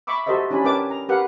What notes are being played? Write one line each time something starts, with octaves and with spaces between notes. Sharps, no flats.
E5 B5 C#6 D6 E6
F#4 G4 A4 C5 D#5 E5
C#4 D4 E4 G4 G#5 B5
C#4 A#4 B4 G5 A5 D6
A#5
G4 A#4 B4 F5 F#5